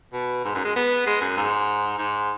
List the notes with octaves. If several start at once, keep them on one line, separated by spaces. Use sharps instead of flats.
B2
G#2
F#2
G#3
B3
G#3
F#2
G#2
G#2